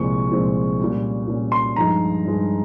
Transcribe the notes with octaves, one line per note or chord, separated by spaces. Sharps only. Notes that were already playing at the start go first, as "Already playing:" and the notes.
Already playing: C2 A#2 F3 G#3 C4 C#6
C2 A#2 F3 G#3 C4
A#2 G3 C#4
A#2 G3 C#4
C6
G2 F3 G#3 D#4 A#5
G2 F3 G#3 D#4